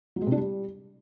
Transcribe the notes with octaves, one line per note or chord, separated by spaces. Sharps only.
F#3
G#3
C3
D4
G3